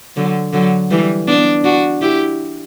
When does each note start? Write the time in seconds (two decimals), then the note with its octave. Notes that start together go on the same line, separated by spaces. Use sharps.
0.16 D3 F#3
0.53 D3 F#3
0.90 E3 G3
1.27 B3 D4
1.64 D4 F#4
2.01 E4 G4